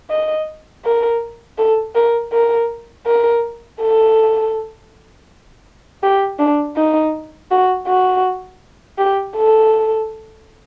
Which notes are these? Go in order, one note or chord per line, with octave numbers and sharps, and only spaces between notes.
D#5
A#4
A4
A#4
A#4
A#4
A4
G4
D4
D#4
F#4
F#4
G4
A4